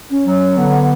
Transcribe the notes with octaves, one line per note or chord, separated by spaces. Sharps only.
C#4
F#3
D3 B3